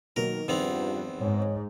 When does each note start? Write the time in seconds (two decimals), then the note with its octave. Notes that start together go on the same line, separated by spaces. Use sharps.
0.16 B2 D#3 F#3 A#3 A#4
0.48 E2 G2 D#3 F3 B3 C4 F7
1.20 G#2 C#5